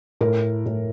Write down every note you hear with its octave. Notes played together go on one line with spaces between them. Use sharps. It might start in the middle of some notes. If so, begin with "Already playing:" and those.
A2 A#4
A2